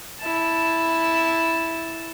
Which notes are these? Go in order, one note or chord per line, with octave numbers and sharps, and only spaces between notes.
E4 A5